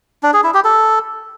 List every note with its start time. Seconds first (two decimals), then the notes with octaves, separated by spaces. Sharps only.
0.23 D4
0.33 G#4
0.44 E4
0.54 G4
0.64 A4